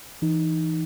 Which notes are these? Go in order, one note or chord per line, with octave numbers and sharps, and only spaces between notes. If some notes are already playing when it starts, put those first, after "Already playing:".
E3 D#4